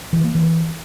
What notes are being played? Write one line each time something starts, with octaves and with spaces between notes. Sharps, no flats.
E3
A#3
E3